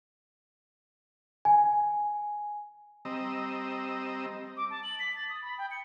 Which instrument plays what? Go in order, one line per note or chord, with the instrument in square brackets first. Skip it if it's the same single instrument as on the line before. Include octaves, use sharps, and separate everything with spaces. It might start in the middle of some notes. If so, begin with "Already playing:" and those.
[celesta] G#5
[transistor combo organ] G3 C4 D#5 A#5 E6
[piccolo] D6
A5
F#7
B6
A6
D#6
B5
G5
C#7